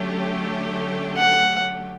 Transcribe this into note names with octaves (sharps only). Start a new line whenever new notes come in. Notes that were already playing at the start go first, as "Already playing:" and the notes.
Already playing: D3 F#3 A3 C#4 G4
F#5